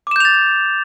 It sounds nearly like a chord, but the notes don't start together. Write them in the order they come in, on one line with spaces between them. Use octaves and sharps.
D6 E7 G6 F7 A6